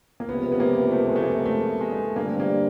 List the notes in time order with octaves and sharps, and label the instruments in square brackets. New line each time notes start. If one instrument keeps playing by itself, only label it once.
[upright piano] A#3
[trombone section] C#2 C3 F3 [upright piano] B3
[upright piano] B3
A#3
A3
G#3
A3
A#3
A3
G#3
A3
[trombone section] G2 D3 G3 C4 [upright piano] A#3
[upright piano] A#3